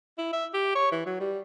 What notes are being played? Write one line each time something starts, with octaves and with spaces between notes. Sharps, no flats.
E4
E5
G4
C#5
E3
F#3
G3